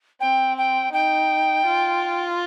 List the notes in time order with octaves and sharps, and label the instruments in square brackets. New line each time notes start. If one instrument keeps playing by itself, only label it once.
[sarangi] C4 [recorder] G5
[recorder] G5
[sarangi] D#4 [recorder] G5
[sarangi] F4